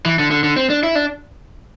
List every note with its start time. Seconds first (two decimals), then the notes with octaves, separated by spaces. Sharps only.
0.05 E3
0.19 D3
0.31 D3
0.44 D3
0.56 C4
0.70 D4
0.83 E4
0.95 D4